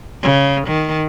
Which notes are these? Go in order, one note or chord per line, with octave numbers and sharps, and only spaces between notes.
C#3
D#3